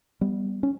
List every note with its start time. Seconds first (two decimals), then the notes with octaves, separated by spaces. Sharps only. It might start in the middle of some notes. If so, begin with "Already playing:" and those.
0.21 G3 B3
0.63 C#4